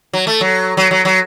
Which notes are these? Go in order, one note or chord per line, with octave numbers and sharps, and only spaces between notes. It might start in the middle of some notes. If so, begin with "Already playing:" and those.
F#3
A3
F#3
F#3
F#3
F#3